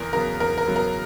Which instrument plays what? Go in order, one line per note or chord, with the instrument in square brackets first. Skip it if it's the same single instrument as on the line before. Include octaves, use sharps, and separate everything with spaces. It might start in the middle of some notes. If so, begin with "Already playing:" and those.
Already playing: [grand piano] E2 [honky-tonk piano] A#4
[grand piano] C#3 F#3 B3 [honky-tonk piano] A#4
[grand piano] E2 [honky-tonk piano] A#4
[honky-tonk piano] A#4
[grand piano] C#3 F#3 B3
[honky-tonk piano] A#4